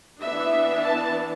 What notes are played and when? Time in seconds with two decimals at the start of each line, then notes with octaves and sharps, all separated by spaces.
0.21 E3 B3 D4 E5
0.83 A5